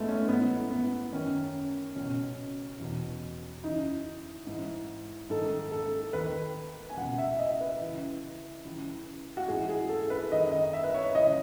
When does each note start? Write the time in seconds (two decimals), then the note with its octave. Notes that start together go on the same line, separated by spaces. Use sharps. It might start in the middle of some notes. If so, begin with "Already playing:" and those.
Already playing: G#2 G#3 A3 B3
0.09 C#4
0.28 G#2 E3 B3
0.71 B3
1.13 F#2 D#3 C#4
1.96 C#2 B2 C#4
2.79 E2 B2
3.63 F#2 C#3 E3 D#4
4.47 G#2 E3
5.30 G#2 D#3 A4
5.72 A4
6.13 D#2 D#3 B4
6.89 G#5
6.97 C#2 B2 F#5
7.18 E5
7.39 D#5
7.61 B4
7.81 C#2 C#3 E3
8.65 C#2 C#3 E3
9.37 F#4
9.48 G#2 E3 G#4
9.69 G#4
9.89 A4
10.10 B4
10.32 F#2 D#3 D#5
10.52 D#5
10.73 E5
10.84 B4
10.94 C#5
11.15 C#2 C#3 E3 D#5